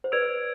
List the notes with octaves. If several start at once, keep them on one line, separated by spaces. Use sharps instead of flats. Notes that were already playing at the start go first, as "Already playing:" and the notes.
C5
B4 D5 E6 G#6 D7 F7